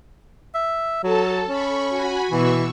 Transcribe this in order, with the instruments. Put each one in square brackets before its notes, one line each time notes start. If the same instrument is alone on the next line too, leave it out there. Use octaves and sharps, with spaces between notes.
[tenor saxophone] E5
[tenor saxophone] F#3 [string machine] A4 A5
[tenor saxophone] C#4 [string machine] B5 C#6
[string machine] F#4 G#5 B5
[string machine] B2 C#6 E6 [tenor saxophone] E3